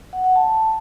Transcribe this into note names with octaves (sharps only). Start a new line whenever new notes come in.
F#5
F#5
A5